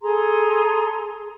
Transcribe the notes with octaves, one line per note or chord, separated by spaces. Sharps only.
G#4 A4 A#5 C6